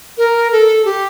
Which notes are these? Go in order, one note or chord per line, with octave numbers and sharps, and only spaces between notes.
A#4
A4
G4